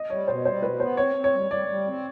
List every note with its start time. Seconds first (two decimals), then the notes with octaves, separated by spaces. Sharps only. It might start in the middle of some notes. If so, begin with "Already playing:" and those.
Already playing: D#5
0.10 G3 C#5
0.28 B2 C5
0.45 G3 C5
0.63 B2 B4
0.80 B3 C5
0.97 C4 C#5
1.16 C4
1.24 C#5
1.33 G3
1.51 G3 D5
1.68 G3
1.86 C4